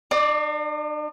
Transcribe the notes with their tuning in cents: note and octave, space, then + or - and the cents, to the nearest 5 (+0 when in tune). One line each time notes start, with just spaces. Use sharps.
D4 +45 D5 +0